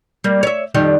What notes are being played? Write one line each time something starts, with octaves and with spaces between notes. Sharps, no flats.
G3 A#3
C#5 E5
F2 D#3 G3